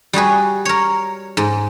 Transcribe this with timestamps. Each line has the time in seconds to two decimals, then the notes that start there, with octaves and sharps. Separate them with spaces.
0.13 G3 F#4 G#4 B4
0.65 A#4 C#5
1.37 G#2